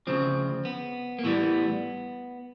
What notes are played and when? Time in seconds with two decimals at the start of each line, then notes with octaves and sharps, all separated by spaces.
0.07 D2 C#3 F3 C4
0.65 B3
1.19 A#3
1.23 A2 E3 G3 B3